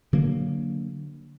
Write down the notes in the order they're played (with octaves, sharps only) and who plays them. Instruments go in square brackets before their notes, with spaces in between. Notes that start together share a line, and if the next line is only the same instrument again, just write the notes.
[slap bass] D3 F#3 A#3